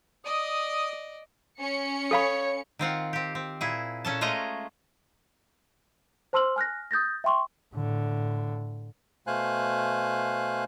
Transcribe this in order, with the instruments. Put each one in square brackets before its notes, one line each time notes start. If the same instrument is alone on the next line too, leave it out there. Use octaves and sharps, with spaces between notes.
[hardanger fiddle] D5 D#5 [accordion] D#6
[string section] C#4 C#7
[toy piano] A4 F5 B5 [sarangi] C#5
[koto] D#3 C4 F4 F#5
C4 G4
C4
A#2 E4 G#4
A#2 C#4 A4 A5
G#3 A3 C#4 F4 D#5 A#5
[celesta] C5 A5 C6 E6 F6 F#7
G#5 F6 F#6 A#6
D#6 G6 A6 A#6
E5 G5 C6 C#6
[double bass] A2 D3
[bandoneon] B2 A3 C5 F5 G#5 F#6